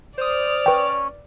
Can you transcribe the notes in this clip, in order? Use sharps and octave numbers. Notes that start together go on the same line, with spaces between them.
C5 D5 D#6 F6
C#4 B4 G5